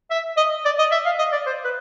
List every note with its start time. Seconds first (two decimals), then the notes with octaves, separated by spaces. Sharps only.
0.11 E5
0.37 D#5
0.65 D5
0.79 D#5
0.92 E5
1.06 F5
1.19 D#5
1.32 D5
1.46 C5
1.64 B4